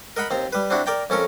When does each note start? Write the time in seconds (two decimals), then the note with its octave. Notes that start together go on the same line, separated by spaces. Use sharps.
0.17 A#4 D#5 F#5 B5
0.31 D#2 C4 A#5
0.53 G3 B4
0.70 C4 D4 E4 F#4
0.86 A#4 D5 G5 A#5
1.10 F2 C#4 A4 A#4